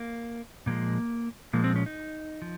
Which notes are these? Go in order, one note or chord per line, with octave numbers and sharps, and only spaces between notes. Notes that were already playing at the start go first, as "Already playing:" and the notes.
Already playing: A#3
A#2 F3 G#3 A#3
A#2 F3 G#3 A#3
C4
C#4
D#4
F3